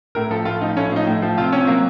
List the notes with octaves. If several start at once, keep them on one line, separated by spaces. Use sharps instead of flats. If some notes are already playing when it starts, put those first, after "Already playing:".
A2 A#4
F3 A4
A2 F4
F3 D#4
A2 C#4
F3 D#4
A2
F3
C3 F4
C3 C#4
F#3 A#3